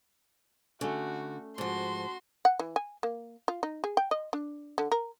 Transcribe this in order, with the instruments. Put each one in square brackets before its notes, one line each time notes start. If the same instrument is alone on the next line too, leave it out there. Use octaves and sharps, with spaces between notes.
[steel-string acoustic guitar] D3 [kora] A3 C#4 [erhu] F#4
[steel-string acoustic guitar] G#2 F3 [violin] F#4 C6 [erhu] A5
[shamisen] F#5
E3
G#5
A#3
F4
D#4
G#4
G5
D#5
D4
D3
A#4